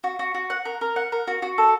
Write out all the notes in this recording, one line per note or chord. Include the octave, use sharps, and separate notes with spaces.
F#4
F#4
F#4
F#5
A#4
A#4
F#5
A#4
F#4
F#4
A4